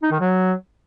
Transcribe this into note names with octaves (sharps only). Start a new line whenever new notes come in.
D#4
D#3
F#3